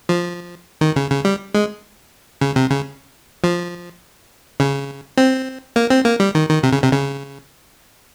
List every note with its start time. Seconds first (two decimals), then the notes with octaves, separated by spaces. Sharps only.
0.09 F3
0.81 D#3
0.96 C#3
1.11 C#3
1.25 G3
1.54 G#3
2.41 C#3
2.56 C3
2.70 C#3
3.44 F3
4.60 C#3
5.17 C4
5.76 A#3
5.90 C4
6.05 A#3
6.20 G3
6.35 D#3
6.49 D#3
6.63 C3
6.73 C#3
6.83 C3
6.92 C#3